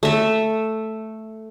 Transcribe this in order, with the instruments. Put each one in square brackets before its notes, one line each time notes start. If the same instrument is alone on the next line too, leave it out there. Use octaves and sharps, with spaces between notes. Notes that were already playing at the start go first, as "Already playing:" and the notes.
[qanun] A3 E5